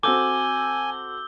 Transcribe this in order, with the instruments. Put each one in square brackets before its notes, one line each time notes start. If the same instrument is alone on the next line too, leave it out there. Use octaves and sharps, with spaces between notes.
[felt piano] C4 F#4 A4 [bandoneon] G#5 [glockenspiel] D6 [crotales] E6 G6 G7